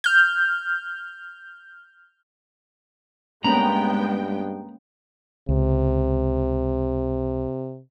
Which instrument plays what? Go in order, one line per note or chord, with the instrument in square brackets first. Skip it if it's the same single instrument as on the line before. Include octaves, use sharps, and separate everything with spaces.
[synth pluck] F6 G6
[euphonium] G2 [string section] G#3 B3 G5 [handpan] A#3 C#4 [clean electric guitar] A#5 B5
[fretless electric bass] C#2 [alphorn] C3